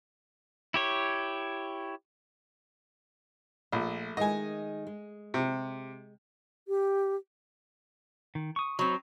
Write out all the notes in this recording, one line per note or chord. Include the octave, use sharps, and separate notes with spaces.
E4 G4 C#5
A#1 A3
D#3 G#3 D#5 G#5
G#3
C3
G4
D#3
C#6 D#6
F#3 C4 D#4 B5